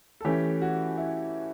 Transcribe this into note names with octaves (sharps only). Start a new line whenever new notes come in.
A4
E3 A3 C#4 G4
F#4
E4